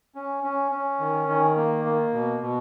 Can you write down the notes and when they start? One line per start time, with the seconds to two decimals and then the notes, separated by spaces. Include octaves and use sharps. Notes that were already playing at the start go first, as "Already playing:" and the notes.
0.15 C#4
0.44 C#4
0.72 C#4
1.00 D#3
1.28 D#3
1.57 A#3
1.85 A#3
2.14 B2
2.42 B2